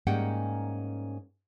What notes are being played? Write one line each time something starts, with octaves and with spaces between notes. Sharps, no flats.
G#2 G3 A#3 C#4 F#5 G5